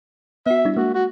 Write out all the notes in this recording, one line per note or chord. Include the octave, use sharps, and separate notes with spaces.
B3 F#4 E5
G3 D4 E4
G#3 A#3 F#4
F#4